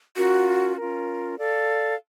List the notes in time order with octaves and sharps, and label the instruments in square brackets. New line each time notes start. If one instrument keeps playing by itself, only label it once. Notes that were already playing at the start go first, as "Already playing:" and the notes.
[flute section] C#4 F4 A#4 [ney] F#4
[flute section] C#4 F4 A#4
A4 D5 F5